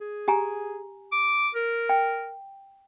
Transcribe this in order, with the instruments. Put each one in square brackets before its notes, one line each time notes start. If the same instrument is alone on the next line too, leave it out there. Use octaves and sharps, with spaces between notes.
[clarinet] G#4
[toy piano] G4 G#5 A#5
[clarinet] D6
A#4
[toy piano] G5